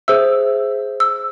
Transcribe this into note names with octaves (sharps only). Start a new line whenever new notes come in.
G#4 C5 E5 E6
E6